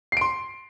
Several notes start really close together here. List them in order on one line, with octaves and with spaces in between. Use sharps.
C7 D7 C6